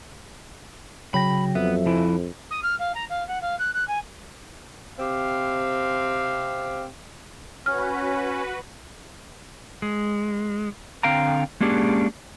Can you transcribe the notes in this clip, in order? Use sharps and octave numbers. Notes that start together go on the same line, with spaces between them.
C#3 F#3 G5 B5 A#6
F2 B3 E5
F3 E4
D#6
F6
F5
A#5
F5
F#5
F5
F#6
F#6
G#5
C3 C4 G4 F5
C#4 F#4 B4 F6
G#3
D3 C4 F5 G5 A#5
G#3 A#3 C#4 D4 G4 G#4